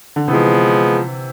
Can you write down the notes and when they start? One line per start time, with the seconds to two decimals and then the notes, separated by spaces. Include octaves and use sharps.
0.16 D3
0.28 C3 E3 F3 G#3 B3